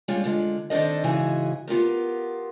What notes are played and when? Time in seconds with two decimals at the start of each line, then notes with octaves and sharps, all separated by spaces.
0.08 G3 G#3 C#4 D4 F4
0.24 D3 G#3 F4
0.70 D#3 C4 D4 A4 D#5
1.04 G#2 C#3 E3 F#4 G#4 G#5
1.68 B3 F4 G4 A#4